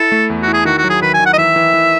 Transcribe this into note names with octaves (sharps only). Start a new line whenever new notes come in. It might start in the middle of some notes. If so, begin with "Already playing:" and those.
Already playing: E4 A4
A3
E2
F#4
E4
G#4
D#3 F#4
F#4
F#3
G#4
D#3 B4
G#5
D#3
F#5
D#5
E3 E5
E3
E3